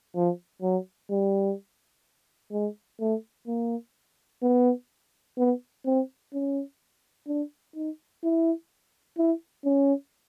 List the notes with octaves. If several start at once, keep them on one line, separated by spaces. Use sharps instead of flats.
F3
F#3
G3
G#3
A3
A#3
B3
B3
C4
C#4
D4
D#4
E4
E4
C#4